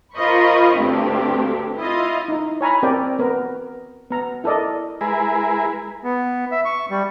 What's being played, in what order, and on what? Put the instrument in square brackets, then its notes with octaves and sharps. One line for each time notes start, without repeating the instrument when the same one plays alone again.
[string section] F4 A#4 C5 D#5 B5 C#6
D2 G2 C4 G4
E4 F4 D#5
[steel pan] D#4 E4
C#5 G#5 A#5 B5
C4 G4 A#4 D5 G5
B3 A#4
B3 A#5
E4 A4 A#4 D5 D#5
[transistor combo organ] G#3 E4 G#4 A#4 B4
[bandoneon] B3
E5
C#6
G3